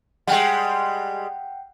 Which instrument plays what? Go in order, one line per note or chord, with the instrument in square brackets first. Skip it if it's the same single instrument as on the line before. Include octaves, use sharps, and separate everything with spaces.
[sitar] G3 G#3 [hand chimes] F#5 G5